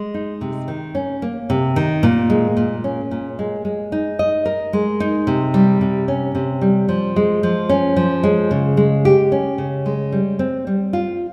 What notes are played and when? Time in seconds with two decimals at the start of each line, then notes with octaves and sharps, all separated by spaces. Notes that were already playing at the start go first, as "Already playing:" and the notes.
Already playing: G#3
0.14 D#4
0.41 C3
0.68 D#3
0.95 C#4
1.22 A#3
1.50 C3
1.76 D#3
2.03 A#2
2.30 G#3
2.57 A#2
2.84 C#4
3.11 A#2
3.39 G#3
3.65 G#3
3.92 D#4
4.19 D#5
4.46 A#4
4.73 G#3
5.00 D#4
5.27 C3
5.54 G3
5.81 C3
6.08 C#4
6.35 C3
6.61 G3
6.89 F3
7.16 G#3
7.43 F3
7.69 C#4
7.97 F3
8.23 G#3
8.51 C#3
8.77 G#3
9.05 G4
9.32 C#4
9.58 C#3
9.86 G#3
10.12 G3
10.39 C4
10.67 G3
10.93 F4